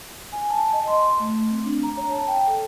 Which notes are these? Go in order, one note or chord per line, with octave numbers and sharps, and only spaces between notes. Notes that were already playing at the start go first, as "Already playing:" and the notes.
G#5
A5
D#5
C6
A3
C4
D4
A#5
C#5
A5
G5
A4